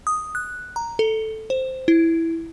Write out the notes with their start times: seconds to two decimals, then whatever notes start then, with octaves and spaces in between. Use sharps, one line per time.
0.07 D#6
0.35 F#6
0.76 A#5
0.99 A4
1.50 C5
1.88 E4